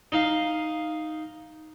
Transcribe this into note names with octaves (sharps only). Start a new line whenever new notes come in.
D#4 F5